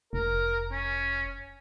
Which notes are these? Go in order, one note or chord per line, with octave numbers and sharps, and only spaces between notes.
F1 A#4
C#4